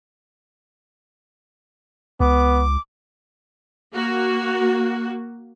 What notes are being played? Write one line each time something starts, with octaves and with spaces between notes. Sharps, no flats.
C#2 B3 D6
A#3 F#4